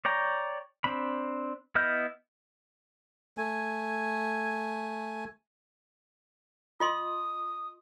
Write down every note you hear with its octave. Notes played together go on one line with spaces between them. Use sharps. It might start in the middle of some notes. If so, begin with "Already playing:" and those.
C#5 D5 G5 A#5
C4 D4 B5
B3 E4 D#5 F6 G6
A3 G#5
F4 D#5 C6 D#6